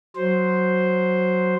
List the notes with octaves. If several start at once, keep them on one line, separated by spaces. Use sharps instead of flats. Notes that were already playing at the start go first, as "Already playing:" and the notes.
F#3 C5